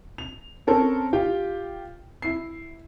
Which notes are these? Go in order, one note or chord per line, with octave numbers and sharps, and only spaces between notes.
F7
C4 C#4 A4 A#4 C5
F4 G4 G5
E4 C7